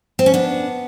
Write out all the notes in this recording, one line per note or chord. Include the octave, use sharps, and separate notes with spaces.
C4
C#4
B3 D4